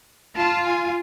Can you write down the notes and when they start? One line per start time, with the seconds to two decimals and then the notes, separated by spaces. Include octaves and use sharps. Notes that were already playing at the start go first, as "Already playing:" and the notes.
0.37 F4 A5
0.67 G#5